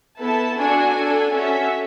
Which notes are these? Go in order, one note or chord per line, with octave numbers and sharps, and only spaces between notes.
B3 E4 A4 A5
D4 F#4 A4 G#5
D4 A4
C#4 F#4 A4 E5